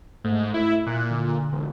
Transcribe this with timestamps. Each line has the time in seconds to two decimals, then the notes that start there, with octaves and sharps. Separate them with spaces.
0.24 G#2 A3
0.54 E4
0.87 A#2 F#6
1.11 D3
1.52 E1